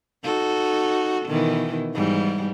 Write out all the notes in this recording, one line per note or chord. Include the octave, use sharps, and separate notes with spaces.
D#4 F#4 A4
B2 D#3 E3
G#2 E3 G3